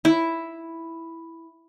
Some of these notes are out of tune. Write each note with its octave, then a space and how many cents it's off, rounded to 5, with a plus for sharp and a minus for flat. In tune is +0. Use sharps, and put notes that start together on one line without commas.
E4 +0